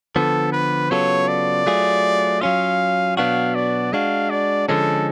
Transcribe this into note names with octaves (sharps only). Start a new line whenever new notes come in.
D3 F3 B3 A4
B4
C#3 F#3 B3 F4 A4 C#5
D5
F#3 A3 F4 G#4
F#3 C#4 F4 F5
B2 F#3 B3 D4 F#4 F5
D5
G#3 D4 F#4 F5
D5
D3 F3 G#3 C#4 A4